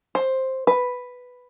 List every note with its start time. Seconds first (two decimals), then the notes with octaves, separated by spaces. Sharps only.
0.15 C5
0.67 B4